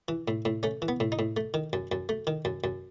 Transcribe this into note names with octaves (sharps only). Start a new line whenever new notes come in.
E3
A2
A2
A3 C#4
E3
B3
A2
D#4
A2
A3
D#3
F#2
F#2
A3
D#3
F#2
F#2